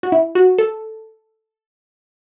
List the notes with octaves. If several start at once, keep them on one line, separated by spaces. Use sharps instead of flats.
F#4
E4
F#4
A4